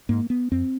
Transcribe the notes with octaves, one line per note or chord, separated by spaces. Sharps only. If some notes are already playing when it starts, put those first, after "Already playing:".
G#2 A#3
B3
F2 C4